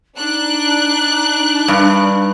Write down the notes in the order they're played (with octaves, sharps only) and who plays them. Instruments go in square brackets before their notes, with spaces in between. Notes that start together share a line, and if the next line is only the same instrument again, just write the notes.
[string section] D4 F#6 [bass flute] D#4
[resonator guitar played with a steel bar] G2